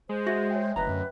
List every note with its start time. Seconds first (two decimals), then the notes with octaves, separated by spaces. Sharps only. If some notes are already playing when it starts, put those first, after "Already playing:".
0.09 G#3 C5
0.27 F#4 E5 G#6 A#6
0.50 C#5 E5 G5
0.76 F#1 D2 B4 D#5 A#5
0.89 F#2